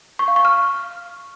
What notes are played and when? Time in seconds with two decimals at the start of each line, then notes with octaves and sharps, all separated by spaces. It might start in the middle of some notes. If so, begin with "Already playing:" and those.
0.19 C#6
0.28 F5
0.36 C#6
0.45 F6